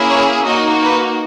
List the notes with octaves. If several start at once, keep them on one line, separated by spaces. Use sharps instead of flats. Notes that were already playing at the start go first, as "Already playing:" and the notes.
Already playing: A#3 C#4 E4 G#4
C#5
A#3 D#4 F#4 D#5
B4